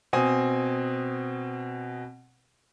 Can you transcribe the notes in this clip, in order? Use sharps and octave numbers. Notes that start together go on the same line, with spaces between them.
B2 C4 G#5 D#6